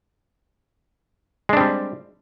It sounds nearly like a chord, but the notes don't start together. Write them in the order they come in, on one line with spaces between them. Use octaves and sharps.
G#3 D4 C4 G3